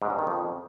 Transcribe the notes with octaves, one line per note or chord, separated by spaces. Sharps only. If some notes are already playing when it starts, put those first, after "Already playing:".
G#2
G2
D#3
F2